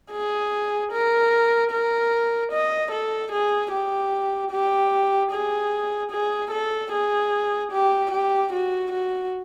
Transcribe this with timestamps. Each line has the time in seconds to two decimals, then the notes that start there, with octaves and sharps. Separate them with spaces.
0.12 G#4
0.92 A#4
1.71 A#4
2.52 D#5
2.92 A4
3.32 G#4
3.72 G4
4.51 G4
5.31 G#4
6.11 G#4
6.51 A4
6.92 G#4
7.71 G4
8.11 G4
8.53 F#4
8.92 F#4